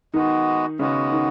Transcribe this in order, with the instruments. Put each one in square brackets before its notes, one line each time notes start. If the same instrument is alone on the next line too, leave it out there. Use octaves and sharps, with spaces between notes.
[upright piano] D#3 D#4 [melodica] G#3 B3 F#4
[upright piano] C#3 C#4 [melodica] G#3 B3 F#4
[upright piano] D#3 D#4